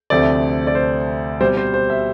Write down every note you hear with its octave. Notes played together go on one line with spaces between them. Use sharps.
D2 C3 F3 A3 C4 D5
D5
C5
B2 G3 C4 C5
C5
C5
E5